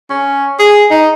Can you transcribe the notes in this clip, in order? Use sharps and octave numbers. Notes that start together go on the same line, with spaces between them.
C#4
G#4
D#4